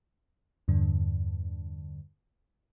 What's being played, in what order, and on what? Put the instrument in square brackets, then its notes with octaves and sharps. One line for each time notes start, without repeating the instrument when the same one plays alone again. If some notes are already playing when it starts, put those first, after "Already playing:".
[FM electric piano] E2 G2 D3